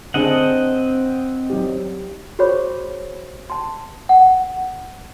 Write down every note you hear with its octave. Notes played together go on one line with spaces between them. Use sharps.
D3 C4 D4 G#4 D#5 F#5
F#3 D#4 G4
F#4 G#4 C5 C#5 B5 C#6
A5 C6
F#5